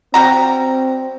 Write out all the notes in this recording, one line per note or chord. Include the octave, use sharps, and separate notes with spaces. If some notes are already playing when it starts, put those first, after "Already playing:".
G3 C4 F#4 A#5